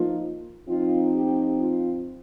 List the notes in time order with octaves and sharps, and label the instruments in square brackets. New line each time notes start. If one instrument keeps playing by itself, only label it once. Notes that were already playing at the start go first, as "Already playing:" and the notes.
Already playing: [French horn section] F3 A#3 D#4 F4
F3 C4 D#4 F4
G4
F4